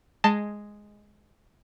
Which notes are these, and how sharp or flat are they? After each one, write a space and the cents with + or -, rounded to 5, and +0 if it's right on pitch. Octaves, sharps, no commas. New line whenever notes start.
G#3 +0 D#5 +0 A5 +15